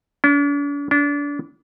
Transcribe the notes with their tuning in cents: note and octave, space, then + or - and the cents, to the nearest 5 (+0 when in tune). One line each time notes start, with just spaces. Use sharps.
D4 -45
D4 -30